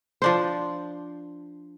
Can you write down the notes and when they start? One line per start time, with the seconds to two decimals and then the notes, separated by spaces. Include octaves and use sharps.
0.22 F3 D4 C5